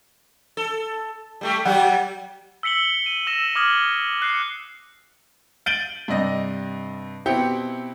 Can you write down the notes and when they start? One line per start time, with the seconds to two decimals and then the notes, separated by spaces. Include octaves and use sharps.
0.57 A4
1.41 G3 A3 G4
1.65 F#3 G3 G4 F#5 G5
2.63 E6 B6 C#7 F#7 G7
3.06 D#7
3.27 E6 A#6 E7 F#7
3.55 D6 D#6 F6 G#6 F#7 G7
4.22 F#6 C7 C#7
5.66 G6 A6 D7 D#7 F#7 G7
6.08 G2 C3 D4 D#5 A#6
7.26 B2 C4 E4 G4 G5 C#7